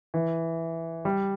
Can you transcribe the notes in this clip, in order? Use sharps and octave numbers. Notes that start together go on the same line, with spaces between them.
E3
G3